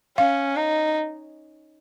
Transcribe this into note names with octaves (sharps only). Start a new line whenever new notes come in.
C#4 F5
D#4